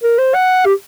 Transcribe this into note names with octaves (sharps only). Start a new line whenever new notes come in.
A#4
C5
F#5
G4